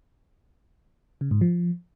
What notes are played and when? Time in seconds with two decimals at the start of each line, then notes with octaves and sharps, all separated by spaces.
1.21 C#3
1.31 G#2
1.41 F3